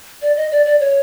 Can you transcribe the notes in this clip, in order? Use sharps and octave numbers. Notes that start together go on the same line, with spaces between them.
D5
D#5
D5
D5
C#5